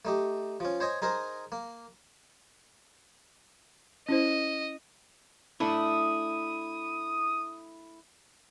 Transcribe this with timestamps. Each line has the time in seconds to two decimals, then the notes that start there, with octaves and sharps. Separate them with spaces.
0.05 A3 D#4 G4
0.60 F3 C#4
0.80 C5 C#5 D#5 G#5
1.02 D#4 G#4 A#4 C5
1.52 A#3
4.08 C#4 E4 C5 D#5
5.60 A3 D4 E4 D#6